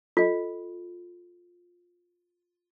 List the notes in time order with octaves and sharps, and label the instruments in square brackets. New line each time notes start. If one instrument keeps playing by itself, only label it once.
[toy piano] F4 [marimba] A4 D#5